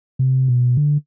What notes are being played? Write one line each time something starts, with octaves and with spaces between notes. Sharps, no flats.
C3
B2
D3